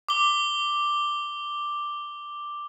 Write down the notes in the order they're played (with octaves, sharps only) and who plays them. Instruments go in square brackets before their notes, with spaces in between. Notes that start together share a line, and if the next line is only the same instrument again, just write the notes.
[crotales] D6 G7